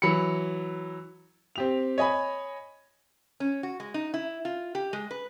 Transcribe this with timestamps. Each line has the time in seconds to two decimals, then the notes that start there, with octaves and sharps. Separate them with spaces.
0.02 E3 F#3 B5 C#7
1.56 C4 G4 F7
1.98 C#5 D#5 G#5 B5
3.40 C#4
3.63 F#4
3.80 G#3
3.94 D#4
4.14 E4
4.45 F4
4.75 G4
4.93 G#3
5.11 B4